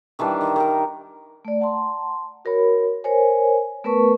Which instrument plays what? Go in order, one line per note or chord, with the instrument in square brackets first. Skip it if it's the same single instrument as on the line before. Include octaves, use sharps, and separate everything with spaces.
[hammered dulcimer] D#3 E3 G3 D4
D#3
D#3 A#4
[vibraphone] A3 D5
F#5 A5 A#5 C6
F#4 A#4 C#5 B5
A#4 C5 C#5 G#5
A3 B3 A#4 B4 A5 C#6